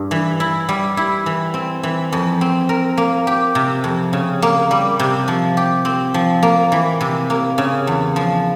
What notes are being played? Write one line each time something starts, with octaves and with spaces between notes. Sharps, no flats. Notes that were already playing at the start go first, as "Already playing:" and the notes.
Already playing: G2 G3
E3
E4
G3
E4
E3
C4
E3
F2
C4
A#4
A#3
G4
C3
F2
C#3
A#3
G3
C3
F3
G4
C4
F3
A#3
E3
C3
A#3
C#3
E2
F3